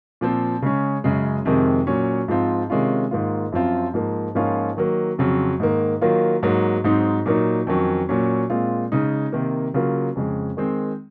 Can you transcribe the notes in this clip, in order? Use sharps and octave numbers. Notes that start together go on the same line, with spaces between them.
A#2 F3 C4
C#3 G#3 C#4
F#2 C#3 G#3
F2 C3 D#3 G#3
A#2 F#3 C#4
G#2 F3 C4 F4
C3 D#3 G#3 C#4 F4
G#2 D#3 A#3 F4
F#2 F3 C4 F4
G#2 F3 A#3
G#2 F3 A#3 C#4 F4
D#3 F#3 A#3
F2 C#3 F#3 C4
G#2 D#3 A#3
D#3 F#3 A#3 F4
G#2 F#3 A#3
G#2 F#3 C4 D#4
A#2 F#3 A#3 D#4
F2 D#3 F#3 C#4
A#2 F#3 C#4
A#2 G#3 C4 F4
C#3 G#3 D#4
C3 D#3 A#3
C#3 F#3 A#3 F4
F2 C#3 G#3
D#3 G#3 C4